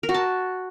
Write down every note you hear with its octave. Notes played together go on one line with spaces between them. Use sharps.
A#4
F#4
A5